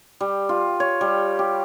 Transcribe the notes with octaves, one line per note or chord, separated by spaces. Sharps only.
G3
F4
C#5
G3
G4